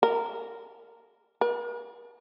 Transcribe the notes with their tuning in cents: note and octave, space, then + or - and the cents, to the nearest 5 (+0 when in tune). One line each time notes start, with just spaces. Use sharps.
A#4 -10
A#4 +45